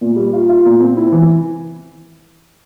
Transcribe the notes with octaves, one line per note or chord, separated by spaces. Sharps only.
A#2
G3
F4
F4
A#2
C4
E4
E3